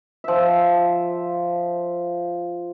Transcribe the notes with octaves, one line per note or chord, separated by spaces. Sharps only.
F3 E5